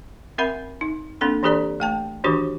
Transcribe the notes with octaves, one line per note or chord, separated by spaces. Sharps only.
C4 A#4 E5 F#5 B5
D#4
A#3 C4 D4 A4 C6
E3 D4 G4 A4 D5 A#5
A3 G5 A5
D#3 E3 D4 F#4 G4 B4